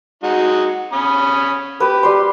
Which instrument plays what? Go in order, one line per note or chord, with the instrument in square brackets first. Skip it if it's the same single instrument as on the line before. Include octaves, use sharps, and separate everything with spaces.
[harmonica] G#3 D#4 F#4
C#4 B5 D#6
[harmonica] G4 [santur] B4
[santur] G3 C6